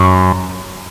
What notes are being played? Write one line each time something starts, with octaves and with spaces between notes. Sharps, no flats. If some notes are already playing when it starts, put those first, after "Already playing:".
Already playing: F#2